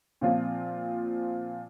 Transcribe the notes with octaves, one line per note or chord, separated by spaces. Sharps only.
A#2 F3 C4 F4